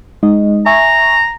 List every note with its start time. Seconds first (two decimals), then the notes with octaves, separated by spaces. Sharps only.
0.23 G#3 D#4 D#5
0.66 E5 G#5 A#5 C#6